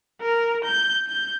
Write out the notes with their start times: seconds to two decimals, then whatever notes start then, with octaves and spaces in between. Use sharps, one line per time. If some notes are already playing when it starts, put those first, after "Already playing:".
0.22 A#4
0.64 G6
1.07 G6